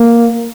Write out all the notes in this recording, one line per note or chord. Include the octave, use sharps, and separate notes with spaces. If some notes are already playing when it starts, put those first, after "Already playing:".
Already playing: A#3